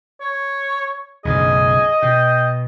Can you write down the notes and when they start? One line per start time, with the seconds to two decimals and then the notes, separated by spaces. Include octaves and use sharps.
0.21 C#5
1.25 B1 F#2 C#3 G#4 D#5
2.02 B2 G5